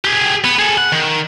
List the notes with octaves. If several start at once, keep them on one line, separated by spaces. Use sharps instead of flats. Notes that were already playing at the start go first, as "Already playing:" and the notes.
G4 G#4
B3
G#4 A4
F#5
D#3